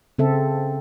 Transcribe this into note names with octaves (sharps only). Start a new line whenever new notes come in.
C#3 C4 A4 E5